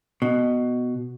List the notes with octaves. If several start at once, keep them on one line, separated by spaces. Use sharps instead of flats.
B2